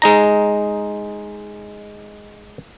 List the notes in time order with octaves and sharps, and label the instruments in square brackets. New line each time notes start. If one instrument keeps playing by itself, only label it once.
[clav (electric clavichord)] G#3 D#4 A#5